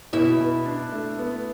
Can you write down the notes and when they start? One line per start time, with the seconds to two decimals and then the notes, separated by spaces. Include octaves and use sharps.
0.13 B2 E4 E5
0.40 B2
0.66 D4
0.92 A3
1.19 B3